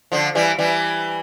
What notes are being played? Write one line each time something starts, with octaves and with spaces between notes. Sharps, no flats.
D3 F3
E3 G3
E3 G3